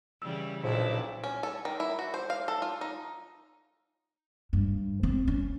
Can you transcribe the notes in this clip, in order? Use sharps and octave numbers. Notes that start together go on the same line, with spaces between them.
C#3 E3 G3 E6
B1 A#2 F3 D4 E4
C#4
A4
D#3
E4
F#4
C5
F5
A4
F4
D#4
G2
C4
C#4